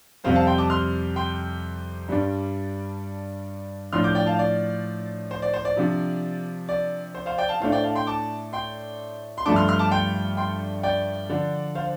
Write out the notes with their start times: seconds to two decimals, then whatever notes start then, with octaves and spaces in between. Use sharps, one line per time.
0.24 F2 C3 G3 C4 C5 F5
0.35 F5 A5
0.47 G5 C6
0.58 A5 D6
0.70 C6 F6
1.16 G5 C6
2.08 G2 G3 D4
3.93 A2 F3 D4 C6 F6
4.04 D6 G6
4.15 D5 G5
4.26 F5 A5
4.39 D5
5.31 C5
5.42 D5
5.53 C5
5.65 D5
5.77 C3 F3 D4
6.69 D5
7.14 C5
7.26 C5 F5
7.38 D5 G5
7.49 F5 A5
7.60 A2 A3 D4 C5 F5
7.72 D5 G5
7.84 F5 A5
7.95 G5 C6
8.07 A5 D6
8.53 G5 C6
9.38 C6
9.45 G2 F3 A3 D4 A5 D6
9.56 C6 F6
9.68 C6 F6
9.79 A5 D6
9.91 G5 C6
10.37 G5 C6
10.83 D5 G5
11.29 D3 F3 D4
11.75 C5 F5